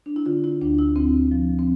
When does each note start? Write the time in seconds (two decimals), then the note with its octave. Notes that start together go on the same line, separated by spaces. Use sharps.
0.06 D4
0.16 E4
0.26 D3 F4
0.44 E4
0.61 D2 D4
0.78 E4
0.96 D2 C4
1.31 F3
1.59 C4